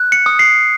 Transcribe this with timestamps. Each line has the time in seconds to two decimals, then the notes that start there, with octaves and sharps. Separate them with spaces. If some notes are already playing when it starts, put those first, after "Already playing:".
Already playing: F#6
0.12 C#7
0.26 D#6
0.39 C7